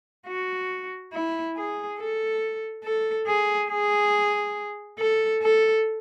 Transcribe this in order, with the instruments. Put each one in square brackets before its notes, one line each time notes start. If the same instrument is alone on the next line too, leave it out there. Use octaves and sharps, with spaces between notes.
[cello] F#4
E4
G#4
A4
A4
G#4
G#4
A4
A4